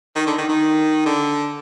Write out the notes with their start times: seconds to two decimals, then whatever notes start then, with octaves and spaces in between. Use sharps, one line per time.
0.16 D#3
0.27 D3
0.38 D#3
0.49 D#3
1.06 D3